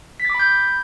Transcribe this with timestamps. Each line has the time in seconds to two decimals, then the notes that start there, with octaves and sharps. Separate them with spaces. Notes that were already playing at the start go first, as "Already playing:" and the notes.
0.20 B6
0.25 A6
0.30 D6
0.35 B5
0.40 G6